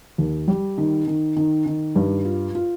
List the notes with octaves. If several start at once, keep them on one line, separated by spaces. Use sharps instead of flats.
D#2
G3
D#3
D#3
D#3
D#3
G2
F4
F4